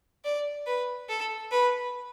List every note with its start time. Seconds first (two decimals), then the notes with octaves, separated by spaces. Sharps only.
0.25 D5
0.67 B4
1.09 A4
1.52 B4